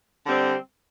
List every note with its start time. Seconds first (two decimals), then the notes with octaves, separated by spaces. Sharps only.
0.26 D3 G3 C4